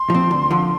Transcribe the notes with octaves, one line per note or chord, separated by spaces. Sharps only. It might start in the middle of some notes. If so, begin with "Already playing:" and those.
Already playing: C6
F3 C4
D2
D3 F3